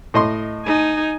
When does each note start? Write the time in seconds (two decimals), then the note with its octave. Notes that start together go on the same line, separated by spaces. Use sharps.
0.14 A2 D#5 C6
0.66 D#4 G#5